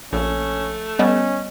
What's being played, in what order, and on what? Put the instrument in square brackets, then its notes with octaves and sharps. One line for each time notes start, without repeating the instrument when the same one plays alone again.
[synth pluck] A#1 [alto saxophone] A3 [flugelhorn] C#4
[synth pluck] G3 B3 [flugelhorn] C#4 [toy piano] D#5